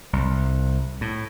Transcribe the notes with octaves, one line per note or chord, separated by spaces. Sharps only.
C2
A2